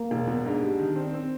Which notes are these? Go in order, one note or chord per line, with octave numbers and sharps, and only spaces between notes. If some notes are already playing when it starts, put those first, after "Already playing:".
Already playing: A#3
E1
B2
G#2 D4
G3
D#3
C4
C4